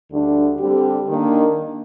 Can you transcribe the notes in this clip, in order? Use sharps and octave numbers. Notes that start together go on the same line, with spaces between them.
D2 D3 G3 D4
D3 G3 C4 G4
D#3 A#3 D4